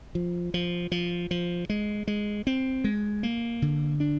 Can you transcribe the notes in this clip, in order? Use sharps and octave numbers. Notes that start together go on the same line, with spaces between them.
F3
F3
F3
F3
G#3
G#3
C4
G#3
A#3
D3
D4